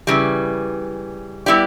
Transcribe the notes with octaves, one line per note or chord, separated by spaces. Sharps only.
C#3 E3 G3
G3 B3 E4 G4 D5